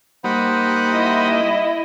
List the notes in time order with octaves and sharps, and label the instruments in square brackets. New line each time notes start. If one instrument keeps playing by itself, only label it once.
[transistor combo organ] G3 A#3 D#4 [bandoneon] C5 F#5 B5
[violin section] E4 D#5